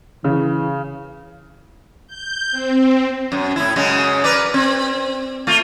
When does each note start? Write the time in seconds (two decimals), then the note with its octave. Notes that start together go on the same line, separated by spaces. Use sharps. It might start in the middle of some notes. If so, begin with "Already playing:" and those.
0.24 C#3 E3
2.07 G6
2.51 C4
3.32 F#2
3.56 A2 E4
3.76 F#2 C#3 G#3
4.24 A#4 B4 D5
4.54 C4
5.47 A3 F4